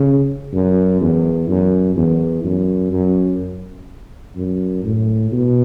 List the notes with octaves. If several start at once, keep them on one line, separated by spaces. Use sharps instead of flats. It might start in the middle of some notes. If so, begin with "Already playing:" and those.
Already playing: C#3
F#2
E2
F#2
E2
F#2
F#2
F#2
A2
B2